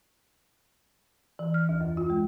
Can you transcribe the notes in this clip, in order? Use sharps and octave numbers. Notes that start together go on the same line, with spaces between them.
E3
F6
D#2
F#2
F4
G#3